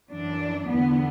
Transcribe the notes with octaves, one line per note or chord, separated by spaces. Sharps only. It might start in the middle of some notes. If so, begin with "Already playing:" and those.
F#2 E3 D4
E2 D3 B3